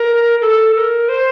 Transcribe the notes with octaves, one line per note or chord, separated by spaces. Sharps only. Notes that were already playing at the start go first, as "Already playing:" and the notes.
Already playing: A#4
A4
A#4
C5